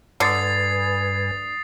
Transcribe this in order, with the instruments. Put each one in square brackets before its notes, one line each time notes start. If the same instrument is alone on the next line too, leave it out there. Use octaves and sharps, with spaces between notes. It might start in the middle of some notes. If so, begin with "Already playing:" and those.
[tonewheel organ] G2 B4 G#5 [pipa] D3 [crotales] D#6 A6 C7